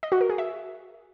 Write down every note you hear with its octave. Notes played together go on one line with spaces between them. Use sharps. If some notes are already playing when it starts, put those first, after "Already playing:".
D#5
F#4
A#4
G#4
E5